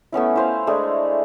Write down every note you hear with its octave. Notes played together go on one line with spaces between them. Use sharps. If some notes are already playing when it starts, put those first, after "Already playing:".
A3 B3 C#4 E4
E4 C5 F5
G#3 A3 D4 G#4